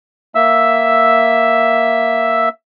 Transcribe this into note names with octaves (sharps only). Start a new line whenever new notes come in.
A#3 E5 E6